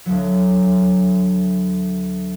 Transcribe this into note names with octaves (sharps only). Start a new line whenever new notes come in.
D2 F#3